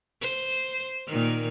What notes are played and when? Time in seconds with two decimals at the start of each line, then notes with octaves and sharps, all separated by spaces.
0.22 C5
1.08 A#2 D#3